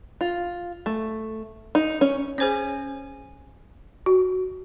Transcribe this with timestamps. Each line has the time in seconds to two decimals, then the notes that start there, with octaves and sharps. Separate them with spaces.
0.21 F4
0.86 A3
1.75 D#4
2.01 C#4
2.38 C#4 G#4 C5 C#5 G#5
4.06 F#4